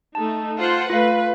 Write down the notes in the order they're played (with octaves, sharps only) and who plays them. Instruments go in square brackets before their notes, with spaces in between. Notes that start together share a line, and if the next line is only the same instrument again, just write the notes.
[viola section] A3 D#4 [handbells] A5
[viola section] F4 C5 F#5
[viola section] A3 B4 [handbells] F4 F5